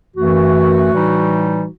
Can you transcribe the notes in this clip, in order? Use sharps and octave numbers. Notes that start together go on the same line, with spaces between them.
F#2 E3 A3 F#4
A2 E3 G3 D#4